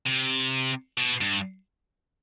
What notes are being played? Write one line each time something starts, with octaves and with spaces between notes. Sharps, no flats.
C3
B2
G2